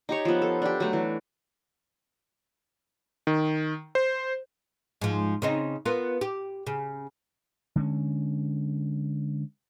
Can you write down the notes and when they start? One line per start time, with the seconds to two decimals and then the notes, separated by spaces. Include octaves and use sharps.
0.09 D#4 G4 C#5
0.25 F3 B3
0.42 A4
0.62 D4 G4
0.80 F#3 A3
0.93 E3
3.27 D#3
3.95 C5
5.01 G#2 F3
5.42 C#3 C4 D#4
5.85 B3 F4 A#4
6.21 G4
6.67 C#3
7.76 D3 G#3 C#4